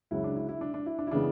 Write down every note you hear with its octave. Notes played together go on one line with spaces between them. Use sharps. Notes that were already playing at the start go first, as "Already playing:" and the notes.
C#2 C#3 F#3 E4
D4
E4
E4
D4
D4
E4
D4
E4
C#3 E3 G#3 B3 D4